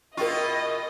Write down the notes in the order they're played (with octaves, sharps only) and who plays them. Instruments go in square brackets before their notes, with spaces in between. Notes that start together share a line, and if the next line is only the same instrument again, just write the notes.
[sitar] B2 E4 F4 [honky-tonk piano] A#4 G5 C#6 [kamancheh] D#5